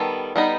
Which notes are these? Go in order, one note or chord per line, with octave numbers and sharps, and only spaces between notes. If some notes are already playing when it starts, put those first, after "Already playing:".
Already playing: D#3 G3 B3 A4
G3 B3 D#4